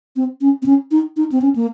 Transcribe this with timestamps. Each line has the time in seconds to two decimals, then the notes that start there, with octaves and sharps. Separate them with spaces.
0.16 C4
0.41 C#4
0.62 C4
0.66 C#4
0.91 D#4
1.17 D#4
1.32 C4
1.42 C#4
1.55 A#3